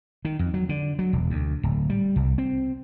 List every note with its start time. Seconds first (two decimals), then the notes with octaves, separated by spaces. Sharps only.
0.25 D#3
0.39 F2
0.54 F#3
0.69 D3
0.99 F#3
1.13 E1
1.30 D2
1.63 D1
1.90 G3
2.16 C2
2.38 C4